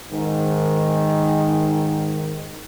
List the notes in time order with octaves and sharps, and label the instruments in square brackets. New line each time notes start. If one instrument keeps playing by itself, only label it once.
[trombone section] G#2 D#3